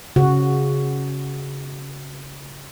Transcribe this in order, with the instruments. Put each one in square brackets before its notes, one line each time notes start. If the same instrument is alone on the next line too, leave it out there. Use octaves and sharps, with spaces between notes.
[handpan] C#3 F#4